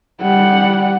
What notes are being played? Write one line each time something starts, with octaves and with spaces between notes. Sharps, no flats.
G3 F#5